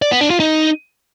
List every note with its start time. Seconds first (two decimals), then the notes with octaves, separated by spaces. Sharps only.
0.02 D5
0.11 B3
0.21 D4
0.30 F4
0.40 D#4